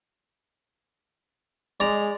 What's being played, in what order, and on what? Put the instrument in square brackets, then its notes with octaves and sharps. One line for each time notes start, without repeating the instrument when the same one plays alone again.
[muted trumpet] G#3 [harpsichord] D5 A#5